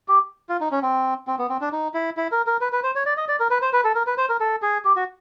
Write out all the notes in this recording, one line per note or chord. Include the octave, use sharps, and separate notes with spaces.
G4
F4
D#4
C#4
C4
C4
B3
C4
D4
D#4
E4
E4
A#4
A#4
B4
B4
C5
C#5
D5
D#5
D5
A#4
B4
C5
B4
A4
A#4
B4
C5
A#4
A4
G#4
G4
F#4